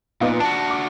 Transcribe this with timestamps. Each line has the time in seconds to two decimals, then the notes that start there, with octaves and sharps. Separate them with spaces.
0.21 A#2 B3 D#4 F4
0.40 D4 F#4 A5
0.70 D6